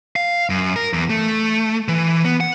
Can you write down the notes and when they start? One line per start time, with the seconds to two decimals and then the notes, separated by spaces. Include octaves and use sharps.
0.16 F5
0.50 F#2
0.76 A#4
0.93 E2
1.10 A3
1.88 E3
2.25 B3
2.40 F#5